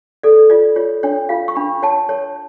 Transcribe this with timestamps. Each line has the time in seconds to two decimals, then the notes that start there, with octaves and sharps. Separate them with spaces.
0.23 A4 D5
0.50 F4 D5
0.76 F4 C#5
1.03 D4 C#5
1.29 F4 F5
1.48 C#6
1.56 D4 B5
1.83 C#5 A5
2.09 C#5